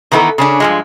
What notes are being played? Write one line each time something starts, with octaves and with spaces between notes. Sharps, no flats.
D#3 E3 B3 D#4 A4
C#3 C#4 D4
G2 F3 G#3